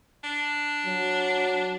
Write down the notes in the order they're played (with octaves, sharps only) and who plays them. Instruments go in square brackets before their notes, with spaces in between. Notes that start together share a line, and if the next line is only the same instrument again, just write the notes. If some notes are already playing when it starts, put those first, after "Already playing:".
[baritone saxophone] D4
[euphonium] F#3